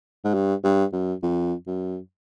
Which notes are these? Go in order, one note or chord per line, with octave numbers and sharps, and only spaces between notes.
G#2
G2
G2
F#2
F2
F#2